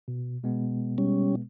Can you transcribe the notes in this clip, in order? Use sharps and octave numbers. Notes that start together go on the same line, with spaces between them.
B2
B2 G#3 B3
G3 C#4